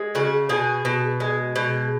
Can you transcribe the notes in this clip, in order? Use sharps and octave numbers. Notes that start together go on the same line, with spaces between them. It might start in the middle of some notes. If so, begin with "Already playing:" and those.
Already playing: G#3
C#3 F#4
B2 G#4
B2
G#3
B2